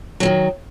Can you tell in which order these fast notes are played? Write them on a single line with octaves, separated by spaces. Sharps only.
F#3 E3 D#3